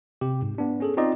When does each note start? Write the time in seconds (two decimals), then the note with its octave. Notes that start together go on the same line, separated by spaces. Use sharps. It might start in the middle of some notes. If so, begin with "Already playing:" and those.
0.21 C3 G4
0.42 G#2
0.58 B3 D4
0.80 C#4 G#4 A4
0.97 C4 D#4 F4 D5 D#5